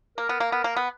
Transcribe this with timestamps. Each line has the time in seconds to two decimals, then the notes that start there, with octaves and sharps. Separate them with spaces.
0.17 A#3 A#4
0.29 B3
0.40 A#3
0.52 B3
0.64 A#3
0.77 B3